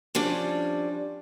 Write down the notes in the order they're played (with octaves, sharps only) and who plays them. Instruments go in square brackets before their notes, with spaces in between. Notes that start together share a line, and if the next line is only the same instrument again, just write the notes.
[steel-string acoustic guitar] F3 G3 C#4 D4